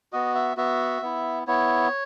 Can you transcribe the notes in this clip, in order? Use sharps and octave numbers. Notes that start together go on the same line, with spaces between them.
B3 F#4 D#5
E5
B3 F#4 E5
B3 E4
B3 E4 C#5